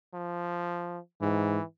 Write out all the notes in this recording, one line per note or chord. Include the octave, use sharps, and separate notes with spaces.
F3
G#2 E3